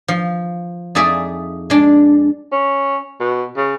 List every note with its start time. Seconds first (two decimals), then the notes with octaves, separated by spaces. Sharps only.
0.08 F3
0.95 F2 D#4 G#4 D5 E5
1.70 G#3 D4
2.52 C#4
3.20 B2
3.57 C#3